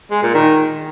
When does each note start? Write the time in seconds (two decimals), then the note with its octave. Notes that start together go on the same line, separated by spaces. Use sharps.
0.11 G#3
0.23 A#2
0.35 D#3